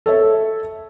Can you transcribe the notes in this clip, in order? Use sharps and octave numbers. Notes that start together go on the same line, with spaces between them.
A4 C#5 E5